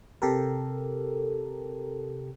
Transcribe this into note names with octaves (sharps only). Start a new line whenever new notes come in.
C3 G4 A4 A#4